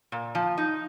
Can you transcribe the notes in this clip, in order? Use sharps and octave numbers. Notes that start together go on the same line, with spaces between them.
A#2
F3
D#4